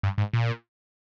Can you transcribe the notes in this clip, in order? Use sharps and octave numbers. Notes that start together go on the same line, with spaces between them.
G2
G#2
A#2